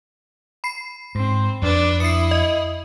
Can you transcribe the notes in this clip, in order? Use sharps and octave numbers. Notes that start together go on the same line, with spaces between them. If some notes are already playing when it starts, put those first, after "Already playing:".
B5 C7
G#2 C4
F2 D4 B4
E4 D#6 C7 C#7
D#5